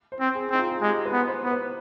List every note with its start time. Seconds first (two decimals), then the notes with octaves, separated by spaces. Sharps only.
0.12 C5
0.20 C4
0.35 G#4
0.51 C4 D#4
0.59 F4
0.70 G#4
0.81 G#3 G4
1.05 B4
1.13 B3
1.28 C5
1.44 B3
1.51 B4